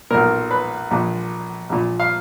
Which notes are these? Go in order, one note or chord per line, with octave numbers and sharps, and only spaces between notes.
B1 A#2 A#4
B4
A#1 A#2
A#1 A#2
F5